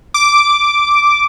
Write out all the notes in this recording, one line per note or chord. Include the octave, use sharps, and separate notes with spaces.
D6